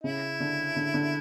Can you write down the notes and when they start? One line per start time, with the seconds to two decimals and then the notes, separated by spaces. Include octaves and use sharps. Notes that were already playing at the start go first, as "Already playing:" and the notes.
0.03 C#3 E4
0.40 D3
0.76 D3
0.94 D3